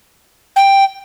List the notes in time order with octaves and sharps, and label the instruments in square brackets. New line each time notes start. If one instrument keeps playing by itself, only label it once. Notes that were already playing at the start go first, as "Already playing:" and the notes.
[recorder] G5